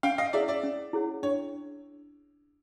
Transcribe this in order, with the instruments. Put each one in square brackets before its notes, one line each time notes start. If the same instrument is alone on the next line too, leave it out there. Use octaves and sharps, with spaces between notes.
[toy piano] C#4 [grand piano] F5 G5
[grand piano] D#5 F5
[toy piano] E4 G#4 C#5 F#5 [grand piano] D5 E5
[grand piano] D5 E5
[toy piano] C#4
E4 G#4 C#5 F#5
[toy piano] D4 [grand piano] C#5